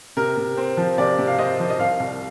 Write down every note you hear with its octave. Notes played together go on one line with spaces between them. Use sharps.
C3 A#4
C3
C4
F3
C3 D5
C3
F5
C4 D#5
F3
D#5
C2 F5
C2